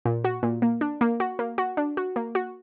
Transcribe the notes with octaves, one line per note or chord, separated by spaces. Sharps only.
A#2
F#4
A#2
A#3
D4
A#3
F#4
A#3
F#4
D4
F#4
A#3
F#4